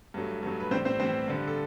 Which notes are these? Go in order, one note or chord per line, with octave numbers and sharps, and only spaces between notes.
G2 F#3 A3
G2 F#3 A3
B4
A2 E3 G3 C4 C5
C4 C5
A2 E3 G3 C4 C5
G2 D3 G3
A4